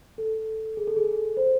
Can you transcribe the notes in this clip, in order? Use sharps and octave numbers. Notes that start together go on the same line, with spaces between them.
A4
G#4
A4
G#4
C5